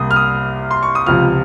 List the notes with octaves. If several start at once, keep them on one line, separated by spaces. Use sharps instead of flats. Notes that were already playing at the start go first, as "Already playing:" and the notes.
Already playing: C2 C3 A#3 D#6
F6
D#6
C6
C#6
D#6
C#2 C3 F3 F6